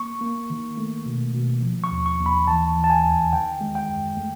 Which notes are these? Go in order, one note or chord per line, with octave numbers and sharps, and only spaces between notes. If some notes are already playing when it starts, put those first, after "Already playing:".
Already playing: A#3 C#6
A#3
D#3
A3
B2
B2
F3
C#6
D#2
C#6
D#2
B5
E3 A5
E3
A5
G#5
E2
D#3 G5
G#3
G5
F#2
A3